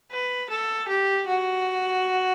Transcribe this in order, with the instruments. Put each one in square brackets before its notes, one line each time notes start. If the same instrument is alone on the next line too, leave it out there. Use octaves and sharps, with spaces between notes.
[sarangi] B4
A4
G4
F#4